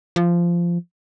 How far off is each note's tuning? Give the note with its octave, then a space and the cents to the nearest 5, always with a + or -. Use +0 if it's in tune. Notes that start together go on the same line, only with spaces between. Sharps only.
F3 -15